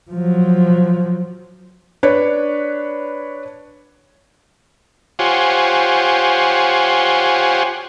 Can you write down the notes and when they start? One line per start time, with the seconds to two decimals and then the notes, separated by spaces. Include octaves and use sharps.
0.11 F3 F#3
2.03 D4 B4 C#5
5.19 F4 G4 C5 C#5 F#5 G#5